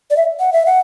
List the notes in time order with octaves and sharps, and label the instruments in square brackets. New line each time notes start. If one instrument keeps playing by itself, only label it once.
[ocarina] D5
E5
F#5
E5
F#5